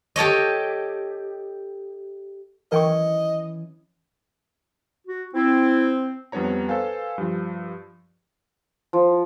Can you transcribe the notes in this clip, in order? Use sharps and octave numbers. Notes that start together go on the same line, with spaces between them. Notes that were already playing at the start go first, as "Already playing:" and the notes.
G4 A4 C#5 D#5
E3 C#4 A#4 D#5 G5 C#6
F#4
C4 E4
F2 G3 B3 D4 C#5 A#5
A4 B4 C5 F5 G#5
G2 F3
F3